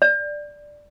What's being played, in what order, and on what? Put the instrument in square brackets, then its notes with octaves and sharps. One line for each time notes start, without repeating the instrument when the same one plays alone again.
[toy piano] D5